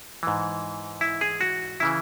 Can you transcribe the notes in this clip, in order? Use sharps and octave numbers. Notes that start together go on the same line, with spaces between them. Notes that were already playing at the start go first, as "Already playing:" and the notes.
G#2 E3
E4
G#4
F#4
C#3 E3 E4